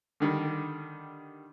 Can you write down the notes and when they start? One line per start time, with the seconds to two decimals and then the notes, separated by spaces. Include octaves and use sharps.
0.20 D3 D#3 G3